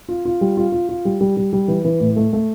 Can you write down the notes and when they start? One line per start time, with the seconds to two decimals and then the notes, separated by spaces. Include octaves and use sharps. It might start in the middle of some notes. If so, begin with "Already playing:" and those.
0.09 F4
0.25 F4
0.41 G3
0.57 F4
0.72 F4
0.89 F4
1.05 G3
1.21 G3
1.37 G3
1.53 G3
1.68 E3
1.84 E3
2.00 A2
2.16 A3
2.33 A3